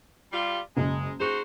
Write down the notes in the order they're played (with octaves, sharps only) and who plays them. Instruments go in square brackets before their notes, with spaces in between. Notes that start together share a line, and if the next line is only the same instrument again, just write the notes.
[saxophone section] G3 F4
[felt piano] F#1 [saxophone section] G#3
[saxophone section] D#4 F#4 C5 [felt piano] G#4